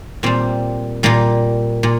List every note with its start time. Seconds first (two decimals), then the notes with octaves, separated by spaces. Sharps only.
0.23 A#2 G3 C4
1.03 A#2 G3 A#3
1.83 A#2